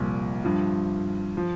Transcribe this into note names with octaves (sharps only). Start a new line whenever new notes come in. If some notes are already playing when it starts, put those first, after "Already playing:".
Already playing: C2 A#2 F3
G2 F3
F3